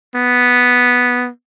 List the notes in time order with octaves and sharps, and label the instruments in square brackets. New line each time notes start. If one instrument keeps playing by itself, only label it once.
[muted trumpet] B3